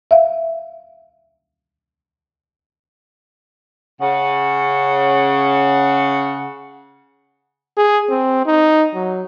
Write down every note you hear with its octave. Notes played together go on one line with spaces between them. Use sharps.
E5 F5
C#3 F#5
G#4
C4
D#4
F#3